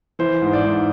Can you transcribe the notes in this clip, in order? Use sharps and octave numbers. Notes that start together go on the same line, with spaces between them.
E3 C5
G#2
D5
G#2